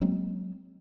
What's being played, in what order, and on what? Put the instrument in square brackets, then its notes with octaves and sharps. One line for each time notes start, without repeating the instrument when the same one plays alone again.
[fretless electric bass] F#3 G#3 A#3 C4